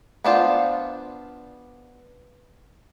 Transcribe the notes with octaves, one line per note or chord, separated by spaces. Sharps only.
B3 D4 F4 C5